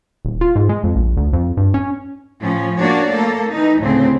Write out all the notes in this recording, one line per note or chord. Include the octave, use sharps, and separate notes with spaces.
D#1
F4
G#2
G#3
F2
A#1
D2
F2
G2
C#4
A2 F3 C#4
A#3 D4 F#4 C#5 D5
A3 A#3 A4
E3 D#4
D2 A2 C#3 C4